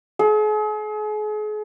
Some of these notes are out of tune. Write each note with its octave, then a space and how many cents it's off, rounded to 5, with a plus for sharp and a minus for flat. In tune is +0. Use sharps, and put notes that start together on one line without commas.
G#4 +40